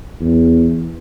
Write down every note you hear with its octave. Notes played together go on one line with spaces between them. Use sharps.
E2